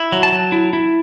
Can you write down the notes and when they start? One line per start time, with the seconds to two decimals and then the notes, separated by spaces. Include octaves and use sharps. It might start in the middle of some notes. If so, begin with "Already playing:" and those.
Already playing: E4
0.12 F#3
0.23 A5
0.32 F#3
0.52 E4
0.73 E4